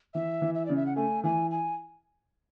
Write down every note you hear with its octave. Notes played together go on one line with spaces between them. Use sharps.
E3 E5
E3
E5
C#3 D5
E5
F#5
A3 G#5
E3 G#5
G#5